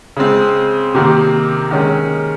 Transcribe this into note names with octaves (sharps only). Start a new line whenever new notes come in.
C#3 G#3 C4
C3 D#3 A#3
D#3 G#3 C#4